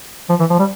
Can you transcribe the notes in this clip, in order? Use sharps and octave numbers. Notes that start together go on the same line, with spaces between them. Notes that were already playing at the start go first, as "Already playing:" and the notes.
F3
E3
F3
G3